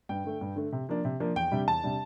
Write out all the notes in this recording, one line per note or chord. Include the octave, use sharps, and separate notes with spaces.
G2 G5
D3 A3
G2
D3 A3
C3
F3 A#3 D4
C3
F3 A#3 D4
E2 G5
C3 G3 D4
E2 A5
C3 G3 D4